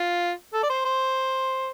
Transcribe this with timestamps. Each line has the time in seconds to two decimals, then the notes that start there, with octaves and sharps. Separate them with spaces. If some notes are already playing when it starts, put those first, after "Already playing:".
Already playing: F4
0.54 A4
0.63 D5
0.70 C5
0.85 C5